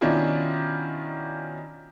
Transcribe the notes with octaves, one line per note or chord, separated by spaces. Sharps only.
B2 D#3 C#4 D4 E4 F4